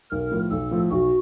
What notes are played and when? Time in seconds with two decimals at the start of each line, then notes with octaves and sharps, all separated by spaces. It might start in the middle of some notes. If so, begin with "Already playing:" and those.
0.11 B1 A#4
0.31 A2 F3
0.51 B1 A4
0.71 A2 F3
0.91 B1 F#4